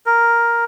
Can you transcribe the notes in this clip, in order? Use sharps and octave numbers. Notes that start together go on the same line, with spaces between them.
A#4